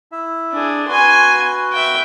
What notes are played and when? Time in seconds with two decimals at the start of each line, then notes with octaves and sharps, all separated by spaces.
0.12 E4 E5
0.52 D4 G#4
0.88 F#4 B4 G#5 C6
1.73 E5 G5